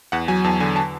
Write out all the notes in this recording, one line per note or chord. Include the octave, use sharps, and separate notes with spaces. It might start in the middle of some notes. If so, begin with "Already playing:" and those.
E2 F#5
F#3 G#5
E2 A5
D3 G#5
A5